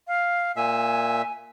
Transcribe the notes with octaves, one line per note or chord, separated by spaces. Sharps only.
F5
A#2 E5 G#5